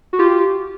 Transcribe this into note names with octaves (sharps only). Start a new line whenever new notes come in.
F#4
F4 G4